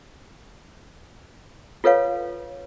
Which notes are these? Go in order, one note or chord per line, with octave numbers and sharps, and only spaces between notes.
F4 A4 B4 C#5 F5